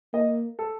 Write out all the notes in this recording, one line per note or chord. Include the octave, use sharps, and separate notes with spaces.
A#3 D#5
A4